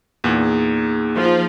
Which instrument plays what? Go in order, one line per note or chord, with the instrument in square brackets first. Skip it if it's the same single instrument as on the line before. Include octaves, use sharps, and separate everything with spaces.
[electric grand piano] E2 A#2 [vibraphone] A#3 D#4 G#4
[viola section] F3 F4